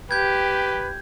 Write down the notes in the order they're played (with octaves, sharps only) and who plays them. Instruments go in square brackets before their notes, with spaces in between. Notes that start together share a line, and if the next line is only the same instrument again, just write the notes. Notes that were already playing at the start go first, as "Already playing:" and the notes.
[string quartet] G4 [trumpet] B4 [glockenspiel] G6 G#6